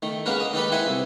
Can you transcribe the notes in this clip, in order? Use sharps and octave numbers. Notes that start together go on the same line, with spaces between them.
D#3 A3
G#3 A#3 C#4 F#4 A#4 B4
D#5
D#3 G4 A4 B4 B5
E4 B4 C5 E5 F#5 G#5
C2